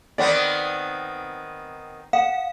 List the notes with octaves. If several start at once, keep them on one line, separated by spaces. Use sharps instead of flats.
D#3 B3 C4 D5
F5 F#5